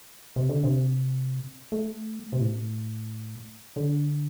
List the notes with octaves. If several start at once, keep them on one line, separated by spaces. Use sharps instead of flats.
C3
D3
C3
A3
C3
A2
D3